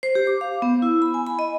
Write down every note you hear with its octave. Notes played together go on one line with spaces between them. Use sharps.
C5
G4
D6
F5
B3
E4
B5
G#5
B5
D#5